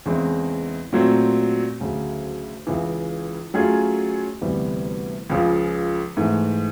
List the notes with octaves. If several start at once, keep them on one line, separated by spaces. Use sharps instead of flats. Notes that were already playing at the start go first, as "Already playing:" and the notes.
E2 C#3 E3 G#3 C4
A#2 F#3 A3 C4
D2 C#3 F#3
C#2 C#3 E3
F#3 A3 C#4 F4 G#4
D2 C3 E3 G3 B3
C#2 C#3 F3
G#2 E3 A3